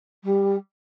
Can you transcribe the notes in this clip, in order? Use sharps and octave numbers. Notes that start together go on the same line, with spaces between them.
G3